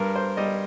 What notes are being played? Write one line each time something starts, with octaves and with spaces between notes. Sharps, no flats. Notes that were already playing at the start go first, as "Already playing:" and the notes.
Already playing: G2 A#4
C5
G3 D#5